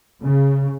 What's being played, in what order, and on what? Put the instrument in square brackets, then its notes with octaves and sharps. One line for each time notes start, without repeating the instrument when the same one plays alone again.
[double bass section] C#3